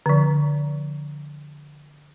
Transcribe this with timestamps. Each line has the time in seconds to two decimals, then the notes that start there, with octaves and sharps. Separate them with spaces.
0.06 D3 F3